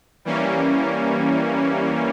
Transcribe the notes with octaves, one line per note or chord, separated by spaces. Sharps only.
E3 G3 A#3 C#4